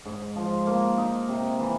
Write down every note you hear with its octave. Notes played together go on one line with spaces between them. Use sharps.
G#2
F3
A#3
D#4
C3
E3